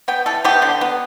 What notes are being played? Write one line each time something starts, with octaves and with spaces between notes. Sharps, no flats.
B3 G5
E3 A4
B3 G4
D3
B3